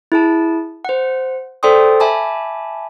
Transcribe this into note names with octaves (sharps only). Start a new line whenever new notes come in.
E4 G#4 A5
C5 F#5
A4 C5 D5 G5 C6 D#6
E5 G#5 A5 B5 D6